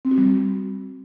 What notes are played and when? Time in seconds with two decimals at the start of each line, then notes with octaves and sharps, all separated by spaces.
0.05 C4
0.11 F#4
0.18 G3